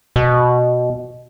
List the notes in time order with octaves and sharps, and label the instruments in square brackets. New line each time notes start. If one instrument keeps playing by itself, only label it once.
[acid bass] B2